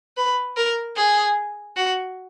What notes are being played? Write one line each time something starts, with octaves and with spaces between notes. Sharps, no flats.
B4
A#4
G#4
F#4